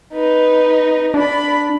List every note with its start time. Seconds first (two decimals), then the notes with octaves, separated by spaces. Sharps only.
0.13 D#4 B4
1.14 D4 D5 B5